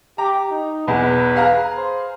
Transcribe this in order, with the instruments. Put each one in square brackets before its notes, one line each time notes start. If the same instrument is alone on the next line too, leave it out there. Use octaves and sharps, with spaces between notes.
[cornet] G4 [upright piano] A#5
[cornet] D#4
[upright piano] B1 E2 [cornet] B4
[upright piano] G#4 F5 A#5
[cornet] C5